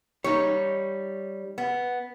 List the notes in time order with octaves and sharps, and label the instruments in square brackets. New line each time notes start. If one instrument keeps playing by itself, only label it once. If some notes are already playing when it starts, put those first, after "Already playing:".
[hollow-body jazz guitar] G3 D#4 [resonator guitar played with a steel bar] C#5
[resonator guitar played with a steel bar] B3